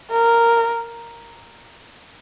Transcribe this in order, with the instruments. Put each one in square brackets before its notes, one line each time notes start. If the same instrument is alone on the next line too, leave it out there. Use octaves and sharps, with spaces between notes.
[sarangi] A#4